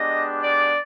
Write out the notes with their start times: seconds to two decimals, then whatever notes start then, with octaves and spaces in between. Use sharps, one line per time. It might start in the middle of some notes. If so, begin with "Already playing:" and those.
Already playing: G#3 B3 D4 G4 D#5
0.42 D5